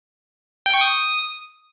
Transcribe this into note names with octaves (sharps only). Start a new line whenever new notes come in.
G5
C#6
D#6